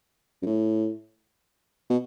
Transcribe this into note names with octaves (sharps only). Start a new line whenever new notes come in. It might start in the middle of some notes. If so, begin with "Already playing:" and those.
F#2
A2
B2